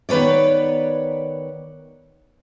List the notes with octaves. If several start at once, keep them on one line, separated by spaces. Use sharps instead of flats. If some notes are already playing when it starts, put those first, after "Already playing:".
D#3 B3 B4 C#5 D5